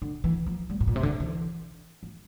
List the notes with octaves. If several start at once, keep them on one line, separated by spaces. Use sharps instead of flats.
D3
E3
F3
G3
A2
A#2
C3
D3
E3
F3